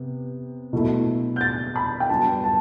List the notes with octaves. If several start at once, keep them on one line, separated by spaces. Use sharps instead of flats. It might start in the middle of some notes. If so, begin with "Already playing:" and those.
Already playing: C3 B3
B2 F#3 A3 E4
G6
A6
B5
G5
G2 F#3 B3 D4 A5
A5